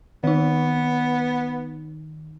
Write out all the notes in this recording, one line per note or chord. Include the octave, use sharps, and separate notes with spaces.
D#3 B3 D#4